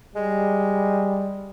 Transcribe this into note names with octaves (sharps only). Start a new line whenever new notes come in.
G3 G#3